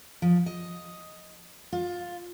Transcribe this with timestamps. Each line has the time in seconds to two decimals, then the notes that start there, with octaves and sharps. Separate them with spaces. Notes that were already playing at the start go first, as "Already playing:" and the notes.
0.22 F3
0.46 D#5
1.73 F4